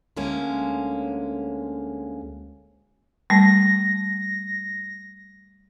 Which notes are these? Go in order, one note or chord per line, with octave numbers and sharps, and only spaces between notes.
D2 D3 G#3 A#3 C#4
G3 A3 A#6